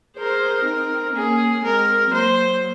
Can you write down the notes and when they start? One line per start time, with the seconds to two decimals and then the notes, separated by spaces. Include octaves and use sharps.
0.18 G#4 A#4 C5
0.66 C4 D#4
1.15 A#3 C#4 G#4
1.64 G#3 C4 A#4
2.13 F#3 A#3 C5